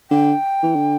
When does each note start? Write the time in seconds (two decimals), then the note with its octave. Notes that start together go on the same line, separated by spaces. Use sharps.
0.11 D3 G5
0.63 E3
0.75 D3